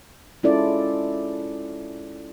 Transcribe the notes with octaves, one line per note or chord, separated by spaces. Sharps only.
G#3 C#4 E4 F4 A4 D5